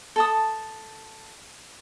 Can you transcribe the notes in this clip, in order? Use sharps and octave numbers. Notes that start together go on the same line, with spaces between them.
A4 A5 D#6